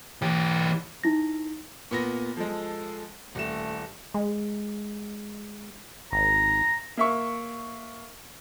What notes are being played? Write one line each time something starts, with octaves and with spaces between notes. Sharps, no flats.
E3 G4
D#4 E4 A#6
A#2 B3 A#6
F3 G#3 A4
D#1 A3 E7
G#3
G#1 A#5
A#3 E5 C#6